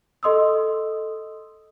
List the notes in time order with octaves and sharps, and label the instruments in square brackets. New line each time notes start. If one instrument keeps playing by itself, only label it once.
[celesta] A4 D#5 C6 D#6 E6